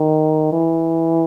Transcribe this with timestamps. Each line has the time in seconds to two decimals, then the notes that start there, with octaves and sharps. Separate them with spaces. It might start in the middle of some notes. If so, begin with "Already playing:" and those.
Already playing: D#3
0.52 E3